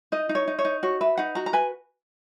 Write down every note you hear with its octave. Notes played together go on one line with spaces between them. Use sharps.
D#4 D#5
D#4
C#5
D#4
C#5
D#4
F#4 C#5
B4 E5
D#4 F#5
F#4 A#5
A#5
B4 G#5